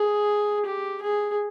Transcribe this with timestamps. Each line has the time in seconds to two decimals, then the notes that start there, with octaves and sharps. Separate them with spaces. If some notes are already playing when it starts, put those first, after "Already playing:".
Already playing: G#4
0.66 G4
1.02 G#4